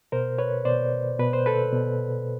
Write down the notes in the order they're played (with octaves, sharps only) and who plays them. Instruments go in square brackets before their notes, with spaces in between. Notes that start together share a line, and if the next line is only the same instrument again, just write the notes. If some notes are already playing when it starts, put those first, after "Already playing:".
[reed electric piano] B2 A#4 C5
B4 C#5
B2 C5 D5
B2 B4
C5
A4 B4
B2